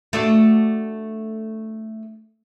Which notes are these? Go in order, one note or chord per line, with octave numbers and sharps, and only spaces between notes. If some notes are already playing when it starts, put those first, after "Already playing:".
A3 D4 F#4